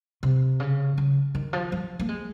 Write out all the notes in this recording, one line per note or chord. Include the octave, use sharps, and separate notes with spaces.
C3
C#3
C#3
D#3
F3
F3
A#3
G#3